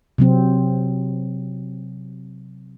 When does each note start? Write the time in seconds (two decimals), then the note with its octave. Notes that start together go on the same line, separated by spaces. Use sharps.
0.18 C3 F#3 C4